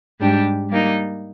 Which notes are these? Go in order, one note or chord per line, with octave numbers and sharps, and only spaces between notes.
G#2 G3 D4 G4
G3 A#3 D#4